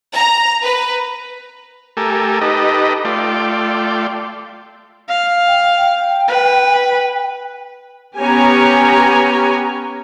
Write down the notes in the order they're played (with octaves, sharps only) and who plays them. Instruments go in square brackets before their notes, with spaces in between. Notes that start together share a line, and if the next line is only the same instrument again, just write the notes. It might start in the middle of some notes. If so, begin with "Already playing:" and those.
[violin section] A#5
B4
[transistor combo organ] A3 G4 A4 A#4 G#5
D#4 G4 A4 B4 D#5
A3 F4 D5 G5
[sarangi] F5
[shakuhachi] G5
[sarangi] B4
[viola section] B3 C#4 G4 C#5 G#5 A#5